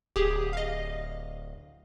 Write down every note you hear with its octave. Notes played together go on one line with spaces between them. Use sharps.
D1 G4 G#4
D#5 F5